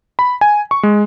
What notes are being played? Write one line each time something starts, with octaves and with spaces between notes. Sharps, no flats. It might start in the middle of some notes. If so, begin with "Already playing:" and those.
B5
G#5
C#6
G#3